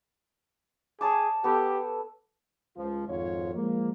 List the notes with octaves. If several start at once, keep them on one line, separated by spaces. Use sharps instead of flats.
G#4 C#5 A5 D6
B3 G4 A4
C#2 F3
G#1 F2 G#2 F4 C#5
F3 G#3 A#3